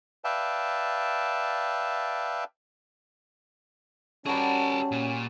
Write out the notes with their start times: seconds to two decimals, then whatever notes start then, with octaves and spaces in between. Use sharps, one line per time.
0.24 B4 D5 E5 F5 G5 A5
4.26 G3 C#4 F#4 G#4 A#4 A5 C#6
4.91 A#2